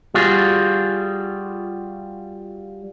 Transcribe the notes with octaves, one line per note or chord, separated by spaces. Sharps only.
G3 F4 F#4 G#4